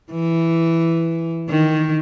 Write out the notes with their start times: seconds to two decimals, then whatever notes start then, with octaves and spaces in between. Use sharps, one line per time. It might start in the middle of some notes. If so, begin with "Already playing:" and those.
0.11 E3
1.49 D#3